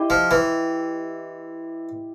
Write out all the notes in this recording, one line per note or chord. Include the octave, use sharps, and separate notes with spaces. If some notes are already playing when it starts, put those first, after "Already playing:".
Already playing: E4 G4 C5 D#5
F3
E3